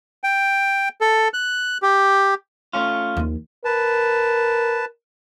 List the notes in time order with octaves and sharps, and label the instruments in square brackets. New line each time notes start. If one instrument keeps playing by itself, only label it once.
[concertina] G5
A4
F#6
G4
[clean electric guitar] A3 C#4 F4
[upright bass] D#2 F3
[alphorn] A#4 [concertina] B4 A5